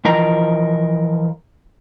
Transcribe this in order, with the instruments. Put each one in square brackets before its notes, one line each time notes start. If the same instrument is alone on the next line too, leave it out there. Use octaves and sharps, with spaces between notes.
[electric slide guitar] E3 F3 A#4 D#5 A#5